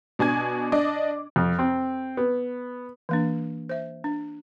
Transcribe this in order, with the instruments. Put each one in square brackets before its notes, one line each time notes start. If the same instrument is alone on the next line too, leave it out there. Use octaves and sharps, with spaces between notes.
[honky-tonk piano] B2 D4 G#5 G#6
D4 D5 D#5 D6
[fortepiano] F2
C4
B3
[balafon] E3 A#3 D4
C5 E5
D4